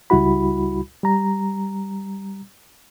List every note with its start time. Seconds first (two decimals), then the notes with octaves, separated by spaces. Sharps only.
0.10 C#2 G3 E4 F#4 B5
1.03 G3 A#5